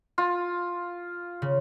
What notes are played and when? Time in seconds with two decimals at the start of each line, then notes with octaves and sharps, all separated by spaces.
0.18 F4
1.42 C#3